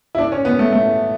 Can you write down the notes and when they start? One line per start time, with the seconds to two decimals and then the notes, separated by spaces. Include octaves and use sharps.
0.15 E4
0.18 D4
0.32 C#4
0.45 B3
0.59 A3
0.73 A3